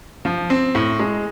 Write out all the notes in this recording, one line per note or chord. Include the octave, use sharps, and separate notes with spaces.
F3
C4
A2
G#3